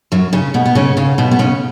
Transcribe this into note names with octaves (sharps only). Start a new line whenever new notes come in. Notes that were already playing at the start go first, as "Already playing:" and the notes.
F#2 F#3
C#3 C#4
B2 B3
B3
C#3 C#4
C#3 C#4
B2 B3
B3
C#3 C#4